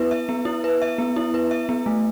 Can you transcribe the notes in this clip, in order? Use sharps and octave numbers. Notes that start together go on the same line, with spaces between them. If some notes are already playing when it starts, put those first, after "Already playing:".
Already playing: B3 E4 B4 E5
E5
B3
E4
B4
E5
B3
E4
B4
E5
B3
A3